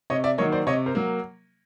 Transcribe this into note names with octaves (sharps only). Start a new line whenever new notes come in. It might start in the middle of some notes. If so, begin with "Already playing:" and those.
C3 C#5 D#5
D5 E5
D#3 F#3 A#3 C#5 D#5
C5 D5
C3 C#5 D#5
A#4 C5
F#3 A#3